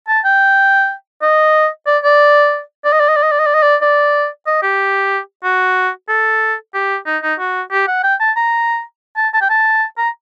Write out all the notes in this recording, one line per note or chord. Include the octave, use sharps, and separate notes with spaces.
A5
G5
D#5
D5
D5
D5
D#5
D5
D#5
D5
D#5
D5
D#5
D5
D#5
D5
D5
D#5
G4
F#4
A4
G4
D#4
D#4
F#4
G4
F#5
G5
A5
A#5
A5
A5
G5
A5
A#5